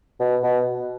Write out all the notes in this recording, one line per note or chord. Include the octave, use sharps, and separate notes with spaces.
B2
B2